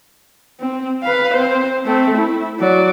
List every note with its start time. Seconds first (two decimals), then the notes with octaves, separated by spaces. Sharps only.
0.60 C4
1.03 B4 F5
1.35 C4 C5
1.86 A3 C4
2.17 E4
2.60 F#3 D5